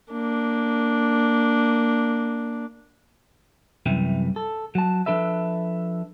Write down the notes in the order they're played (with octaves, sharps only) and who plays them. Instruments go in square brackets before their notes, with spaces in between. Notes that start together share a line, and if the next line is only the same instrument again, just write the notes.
[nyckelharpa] A#3 D4
[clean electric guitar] C2 F#2 C3 E3 G3
A4
F#3 A5
F3 D4 A4 B4 E5